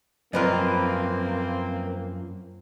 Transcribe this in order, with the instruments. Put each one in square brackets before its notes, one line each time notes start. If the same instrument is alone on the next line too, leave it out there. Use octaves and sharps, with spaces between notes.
[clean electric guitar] F#2 F3 [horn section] A#3 C4 [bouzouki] A#4 B4 D#5